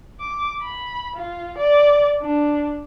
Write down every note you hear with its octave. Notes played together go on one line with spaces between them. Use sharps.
D6
B5
F4
D5
D4